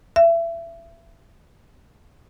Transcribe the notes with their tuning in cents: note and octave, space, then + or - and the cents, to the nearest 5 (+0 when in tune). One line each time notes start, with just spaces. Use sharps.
E5 +30